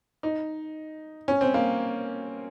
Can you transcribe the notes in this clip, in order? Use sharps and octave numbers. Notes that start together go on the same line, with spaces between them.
D#4
C#4
C4
A#3